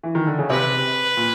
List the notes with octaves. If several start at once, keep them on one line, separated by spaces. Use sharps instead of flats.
E3
D#3
D3
C#3
C3 B4
A#2